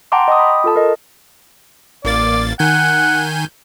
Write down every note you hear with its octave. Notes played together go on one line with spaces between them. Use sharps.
F#5 G5 A5 A#5 C6 D6
D#5 G5 D6 D#6
B5
F4 A4 A5
A#4 D#5
A1 A#3 D5 A6
D#3 F#5 G#5 G6